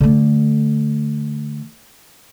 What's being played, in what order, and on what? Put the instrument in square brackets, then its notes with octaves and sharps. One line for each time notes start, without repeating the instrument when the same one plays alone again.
[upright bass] D3 A3